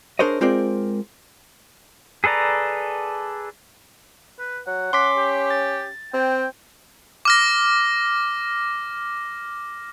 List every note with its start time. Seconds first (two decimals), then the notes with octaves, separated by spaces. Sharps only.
0.19 D4 G#4 A#4 C5 C#5 D#5
0.41 G#3 C4 F4 A#4 C5 D5
2.24 G#4 A4 B4 D5 A#5
4.39 B4
4.67 F#3 F#5
4.93 C#4 C6 D6 B6
5.17 G4
5.50 A6
6.14 C4 G5
7.25 D6 F6 A#6